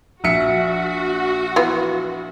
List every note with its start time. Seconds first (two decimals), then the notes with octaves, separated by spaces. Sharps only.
0.24 A#1 F#4 E5 C#7
1.56 E3 B3 F4